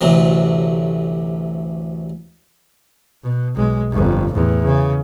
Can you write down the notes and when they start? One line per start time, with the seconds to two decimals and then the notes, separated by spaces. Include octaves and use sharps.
0.01 A1 D2 C3 F#3
3.23 B2
3.55 B1 G#3
3.92 G1 F2
4.32 E2 A2
4.65 C#3